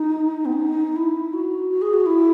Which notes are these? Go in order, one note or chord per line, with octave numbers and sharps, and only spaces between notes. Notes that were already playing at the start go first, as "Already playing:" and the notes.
Already playing: D#4
B3
C#4
D#4
E4
F#4
F#4
G#4
F#4
E4